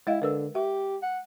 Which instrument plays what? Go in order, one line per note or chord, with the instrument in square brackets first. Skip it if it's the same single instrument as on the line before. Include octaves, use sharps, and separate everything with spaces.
[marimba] G#3 D#5 F5 [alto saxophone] E4
[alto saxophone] D3 [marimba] A#4 B4 E6
[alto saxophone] G4 [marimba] E5
[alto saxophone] F#5